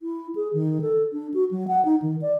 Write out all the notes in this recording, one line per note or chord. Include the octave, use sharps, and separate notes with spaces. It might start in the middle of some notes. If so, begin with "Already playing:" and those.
E4
G#4
D#3
A4
D4
F#4
F#3
F#5
D#4
D#3
D5